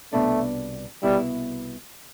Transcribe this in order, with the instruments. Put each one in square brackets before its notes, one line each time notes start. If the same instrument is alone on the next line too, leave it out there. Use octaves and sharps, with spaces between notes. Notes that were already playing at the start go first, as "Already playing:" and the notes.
[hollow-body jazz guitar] C2 B2 B3 D4 [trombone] A3
[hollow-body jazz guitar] C2 B2 B3 E4 [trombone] G3